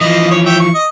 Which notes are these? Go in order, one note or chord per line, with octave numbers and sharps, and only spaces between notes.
E3 F3 D#5
C#5
C#5 E5 G5
C#6
D#5